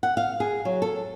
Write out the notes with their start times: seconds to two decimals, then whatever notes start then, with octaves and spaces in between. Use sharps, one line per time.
0.03 F#5
0.17 F5
0.40 G#4
0.65 F#3
0.82 A4